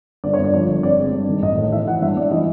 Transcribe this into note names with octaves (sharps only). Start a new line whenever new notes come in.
G1 D5
C#5
G1 D5
F3 C#5
G1
C4 D5
G#3
G2
D#3
A1 D#5
A2
E3 E5
E3 F#5
G2 E5
G2 D5
E3 D#5